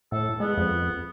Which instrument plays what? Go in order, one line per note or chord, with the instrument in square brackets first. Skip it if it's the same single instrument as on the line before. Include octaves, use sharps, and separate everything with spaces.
[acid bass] A2 [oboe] A4
[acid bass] G#3 [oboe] B3
[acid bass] F2